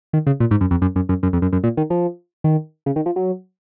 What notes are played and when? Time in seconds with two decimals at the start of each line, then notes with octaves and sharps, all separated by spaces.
0.13 D#3
0.26 C#3
0.40 A#2
0.51 G#2
0.61 F#2
0.71 F2
0.82 F#2
0.96 F#2
1.09 F#2
1.23 F#2
1.33 F2
1.42 F#2
1.53 F#2
1.64 A#2
1.77 D#3
1.90 F3
2.44 D#3
2.86 C#3
2.96 D#3
3.06 F3
3.16 F#3